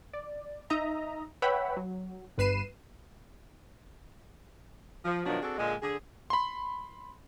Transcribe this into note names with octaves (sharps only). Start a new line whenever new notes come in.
D5
D#4 D#5 E5 A#5
B4 C#5 E5 F#5 G5 B5
F#3
G1 G2 B4 C7 D#7 E7
F3
B2 D#3 F3 F#3 D4
C4 D4 F#4 G#4 A4
A#2 D3 G#3
D3 G#4
B5 C6